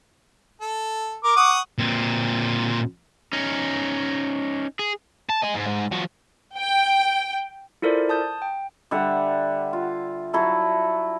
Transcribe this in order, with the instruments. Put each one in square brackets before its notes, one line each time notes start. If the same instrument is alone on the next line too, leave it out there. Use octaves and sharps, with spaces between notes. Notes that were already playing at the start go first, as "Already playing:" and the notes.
[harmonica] A4
[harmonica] A#4 [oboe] D6
[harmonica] F#5 C#6 D#6
[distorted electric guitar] A#2 C4
[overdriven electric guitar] C#4 D#4
G#4
[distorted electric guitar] A5
D#5 G#5
G#2
G#2
F3 F#4
[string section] G5
[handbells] E4 F4 A4 A#4 C5 D5
A5 D#6 G6
G5
[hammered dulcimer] D3 G3 E5 F#5
F4
F#3 E4 A4